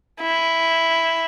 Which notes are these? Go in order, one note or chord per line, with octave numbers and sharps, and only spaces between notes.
E4